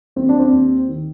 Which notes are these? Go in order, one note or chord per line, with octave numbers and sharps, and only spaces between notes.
D#2 C4
D4
C4
D#2
D#3